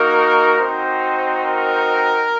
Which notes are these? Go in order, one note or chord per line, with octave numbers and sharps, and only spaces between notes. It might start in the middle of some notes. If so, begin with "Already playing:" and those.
Already playing: A#3 D#4 F#4 A#4
C4 D#4 F#4 C5
A#4